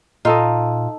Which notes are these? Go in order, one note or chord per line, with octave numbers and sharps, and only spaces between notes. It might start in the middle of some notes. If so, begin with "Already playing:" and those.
A#2 D#4 F4 A4 D#5